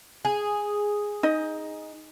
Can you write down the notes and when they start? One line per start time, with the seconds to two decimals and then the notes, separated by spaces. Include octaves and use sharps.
0.25 G#4
1.23 D#4 D#5